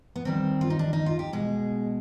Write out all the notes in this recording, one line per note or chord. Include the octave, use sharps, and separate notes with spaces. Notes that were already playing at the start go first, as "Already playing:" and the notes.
B3
D#2 D#3 G3 C4
F4
D#4
D4
D#4
F4
G4
B2 G#3 G#4